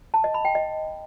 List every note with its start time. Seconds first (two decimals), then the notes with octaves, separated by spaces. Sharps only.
0.14 A5
0.24 D#5
0.34 B5
0.45 G5
0.55 D#5